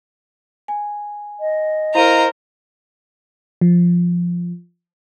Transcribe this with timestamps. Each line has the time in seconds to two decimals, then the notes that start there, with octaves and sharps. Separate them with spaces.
0.68 G#5
1.40 D#5
1.95 E4 A#4 C5 F5 A#5 D#7
3.61 F3